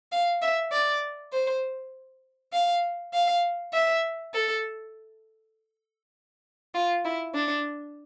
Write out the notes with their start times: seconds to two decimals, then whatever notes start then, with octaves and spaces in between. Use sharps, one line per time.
0.12 F5
0.42 E5
0.72 D5
1.33 C5
2.53 F5
3.14 F5
3.73 E5
4.34 A4
6.74 F4
7.05 E4
7.34 D4